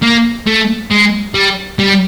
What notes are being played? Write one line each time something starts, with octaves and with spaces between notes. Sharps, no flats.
A#3
A3
G#3
G3
G3